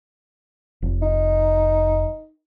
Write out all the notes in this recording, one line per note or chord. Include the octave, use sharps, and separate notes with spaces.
F1
D#4